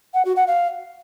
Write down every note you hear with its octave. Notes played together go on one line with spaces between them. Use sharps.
F#5
F#4
F#5
F5